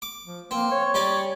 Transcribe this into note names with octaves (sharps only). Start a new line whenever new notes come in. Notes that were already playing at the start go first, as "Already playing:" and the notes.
D6
F3
A#3 C4
C#5
G3 C#4 D5